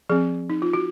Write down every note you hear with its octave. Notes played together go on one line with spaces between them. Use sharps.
F3 C4 G#4
D#4
F4
F#4